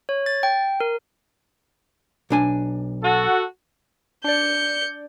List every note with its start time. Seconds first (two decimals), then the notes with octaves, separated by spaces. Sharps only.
0.09 C#5
0.26 A6
0.43 G5
0.80 A#4
2.30 B1 D4 G#5
3.03 F#4 A4
4.24 D4 D5 G6 C#7